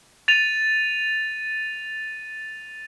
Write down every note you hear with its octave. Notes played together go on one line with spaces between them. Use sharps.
A6 D#7 F7